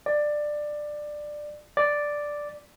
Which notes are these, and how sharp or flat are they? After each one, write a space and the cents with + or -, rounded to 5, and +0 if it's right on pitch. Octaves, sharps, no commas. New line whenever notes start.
D5 +15
D5 +0